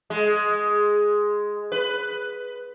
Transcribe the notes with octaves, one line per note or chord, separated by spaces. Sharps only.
G#3
B4